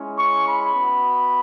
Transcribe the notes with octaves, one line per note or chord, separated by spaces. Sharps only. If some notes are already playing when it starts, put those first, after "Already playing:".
Already playing: G#3 C#4 E4
C#6
B5
B3 F#4